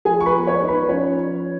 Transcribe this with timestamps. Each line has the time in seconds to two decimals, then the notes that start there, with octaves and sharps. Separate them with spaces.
0.05 F3 G#4 G#5
0.20 C#6
0.26 B4 B5
0.33 B3
0.47 C#5 C#6
0.62 D#4
0.68 B4 B5
0.83 B4
0.89 F3 C#4 C#5
1.17 F3